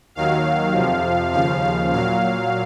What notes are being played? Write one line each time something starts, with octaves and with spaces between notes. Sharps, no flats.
D#2 D#3 F#3 F5
F2 C3 F3
D#2 C#3 F3 F5
F5
A#2 F#3 F5